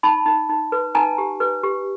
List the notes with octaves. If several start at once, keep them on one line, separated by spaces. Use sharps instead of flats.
D#4 A5 B5
D#4
D#4
B4
D#4 G#5 A#5
G4
B4
G4